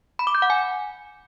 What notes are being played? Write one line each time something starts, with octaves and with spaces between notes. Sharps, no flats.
B5
D6
G6
F#5
G#5